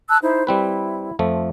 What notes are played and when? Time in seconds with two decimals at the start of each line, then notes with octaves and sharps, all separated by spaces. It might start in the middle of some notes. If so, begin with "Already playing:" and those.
0.09 A5 E6 F#6
0.22 D#4 E4 C5
0.47 G3 C4 E4 B4
1.19 F2 F3 A3